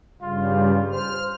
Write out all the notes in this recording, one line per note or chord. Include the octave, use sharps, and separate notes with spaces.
G2 C#3 G3 F4
C5 F6